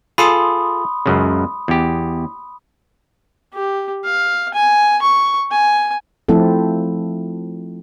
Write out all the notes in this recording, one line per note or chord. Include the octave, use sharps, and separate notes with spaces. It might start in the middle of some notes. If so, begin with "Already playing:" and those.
F4 G#4 A4 B5 C6 D#6
C#2 F#2 C#3
E2 G4
G4
F5
G#5
C#6
G#5
F3 A3 C4 E4 A4